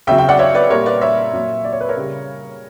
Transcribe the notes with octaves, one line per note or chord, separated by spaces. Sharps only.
C#3 F#3 E5 G5
E5 G5
D5 F#5
C#5 E5
B4 D5
A#2 G3 A#4 C#5
B4 D5
C#5 E5
A#2 F#3
D5
C#5
B4
A#4 C#5
C#3 G3